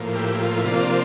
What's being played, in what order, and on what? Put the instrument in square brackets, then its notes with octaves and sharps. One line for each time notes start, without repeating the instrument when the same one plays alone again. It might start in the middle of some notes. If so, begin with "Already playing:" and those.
Already playing: [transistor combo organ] A2 F3 A#3
E4 G4
G4
F4
E4
C3 F3 A#3 D4 F4